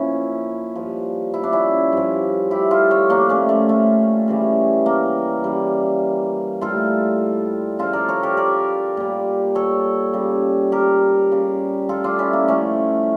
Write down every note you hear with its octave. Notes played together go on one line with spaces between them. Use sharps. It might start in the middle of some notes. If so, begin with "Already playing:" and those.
Already playing: A#2 F3 C#4 E4
G2 F3
E4
D4
C#4 E4
G2 F3
E4 G4
F4 A4
A4 C#5
A#2 F3 A#3 D4
A3 C#4
A3
A3
C#3 E3 G3
A#3
C#3 E3 G3
A2 G3 F4 A4
C#3 F3 F4 A4
A#4 D5
A4 C#5
G4 A#4
A#4 D5
A#2 G3
A4 C#5
C#3 G3
G4 A#4
C#3 G3
F4 A4
D4 F4
C#4 E4
A#3
A2 F3 A3 C#4